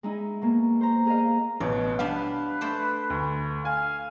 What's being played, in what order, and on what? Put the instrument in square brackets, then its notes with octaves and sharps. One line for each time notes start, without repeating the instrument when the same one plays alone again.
[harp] G#3 D#4 E4
B2 A#3
C5 A#5
G#4 A#4 D#5 F5
[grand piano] A1 B2 [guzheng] D5
[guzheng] G3 B3 D4 [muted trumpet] B4 [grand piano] F5
[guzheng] A3 C5 D5
[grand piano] D2
[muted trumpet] F5 [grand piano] G#5